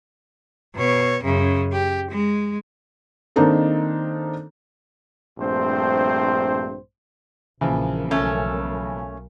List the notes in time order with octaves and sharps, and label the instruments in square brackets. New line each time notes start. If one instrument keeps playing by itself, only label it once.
[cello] B2 C#5
F#2 C#3
G4
G#3
[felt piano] D#3 A#3 C4 D4 D#4 A4
[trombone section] A#1 G2 A3 C4 C5
[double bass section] A#1 A#3 [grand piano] C#3 E3 F3
[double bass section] B1 A#3 [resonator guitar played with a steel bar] A3 C#4